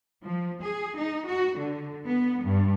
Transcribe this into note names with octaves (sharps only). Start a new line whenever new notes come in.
F3
G#4
D#4
F#4
D3
B3
G2